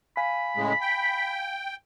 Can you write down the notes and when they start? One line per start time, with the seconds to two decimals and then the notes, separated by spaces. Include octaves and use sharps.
0.17 F5 G#5 B5
0.57 A2 C#3 G#3
0.81 G5